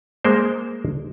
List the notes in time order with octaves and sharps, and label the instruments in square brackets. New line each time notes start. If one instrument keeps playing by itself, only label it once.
[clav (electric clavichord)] G#3 A#3 A#4 C5